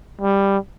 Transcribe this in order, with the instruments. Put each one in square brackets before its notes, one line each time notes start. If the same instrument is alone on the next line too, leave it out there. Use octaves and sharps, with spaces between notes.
[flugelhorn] G3